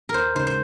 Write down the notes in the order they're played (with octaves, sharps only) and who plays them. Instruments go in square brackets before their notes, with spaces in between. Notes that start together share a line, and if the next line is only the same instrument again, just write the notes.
[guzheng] A#4
[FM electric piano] D#2 [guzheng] C5
[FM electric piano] C#3 G#3 D#4 [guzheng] C5
[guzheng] C5